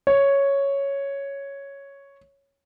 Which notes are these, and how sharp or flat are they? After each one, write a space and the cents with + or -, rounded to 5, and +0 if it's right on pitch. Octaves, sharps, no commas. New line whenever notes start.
C#5 +0